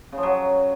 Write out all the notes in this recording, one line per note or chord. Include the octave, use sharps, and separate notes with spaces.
C#3
F3
F#3